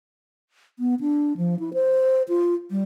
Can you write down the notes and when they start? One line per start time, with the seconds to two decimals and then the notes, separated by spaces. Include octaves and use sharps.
0.79 B3
1.01 D4
1.37 F3
1.60 E4
1.74 C5
2.29 F4
2.71 G3